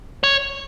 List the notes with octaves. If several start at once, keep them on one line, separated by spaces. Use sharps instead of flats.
C#5